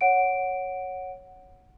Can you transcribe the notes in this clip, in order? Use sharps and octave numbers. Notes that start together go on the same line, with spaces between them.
C#5 F#5 D7